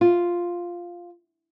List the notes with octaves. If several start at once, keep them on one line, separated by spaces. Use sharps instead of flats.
F4